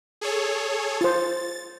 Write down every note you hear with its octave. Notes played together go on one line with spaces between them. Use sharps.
G#4 A4 C#5
F4 C5 A6